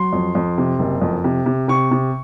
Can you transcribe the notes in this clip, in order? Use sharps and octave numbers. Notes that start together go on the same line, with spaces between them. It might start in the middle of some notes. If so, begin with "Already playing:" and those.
Already playing: F#3 C6
F2
F2
C3
F#1
F2
C3
C3
C3 C#6
C3